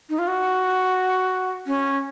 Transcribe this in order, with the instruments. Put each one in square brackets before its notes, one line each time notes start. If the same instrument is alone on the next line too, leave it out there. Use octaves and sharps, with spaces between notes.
[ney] D#4
F4
F#4
C#4